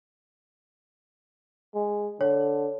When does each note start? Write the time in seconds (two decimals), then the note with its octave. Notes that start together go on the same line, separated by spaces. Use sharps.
1.75 G#3
2.21 D3 C#5